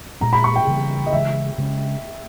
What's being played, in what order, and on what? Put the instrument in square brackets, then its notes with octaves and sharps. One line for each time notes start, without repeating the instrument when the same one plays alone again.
[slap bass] A#2 G#3 C#4 [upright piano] A#5
[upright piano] B5
C#6
G5
[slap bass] C#3 E3 G3 A#3
[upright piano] D#5
[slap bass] C#3 E3 G#3 [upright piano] E5
[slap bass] C#3 G#3 C#4